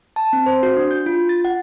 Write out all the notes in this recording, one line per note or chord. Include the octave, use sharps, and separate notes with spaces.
A5
C4
C5
F#4
D4
G6
F4
A6
F#5